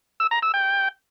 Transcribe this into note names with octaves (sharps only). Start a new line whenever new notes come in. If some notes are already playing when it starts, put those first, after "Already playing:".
E6
A#5
E6
G5